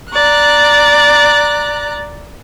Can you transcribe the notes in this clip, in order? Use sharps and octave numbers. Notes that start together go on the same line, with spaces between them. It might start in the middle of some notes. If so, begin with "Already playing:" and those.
D5 A#5 F#6